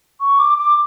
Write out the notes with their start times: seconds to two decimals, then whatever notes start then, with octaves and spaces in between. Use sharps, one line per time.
0.21 C#6
0.39 D6
0.58 D6